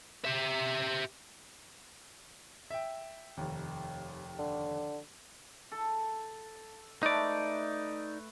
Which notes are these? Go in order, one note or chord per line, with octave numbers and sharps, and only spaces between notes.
G4 E5
E5 G5
F1 D#2
D3
A4
A3 D#4 B4 D5